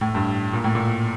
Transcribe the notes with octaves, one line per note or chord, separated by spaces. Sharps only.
A2
G2
A#2
A2
A#2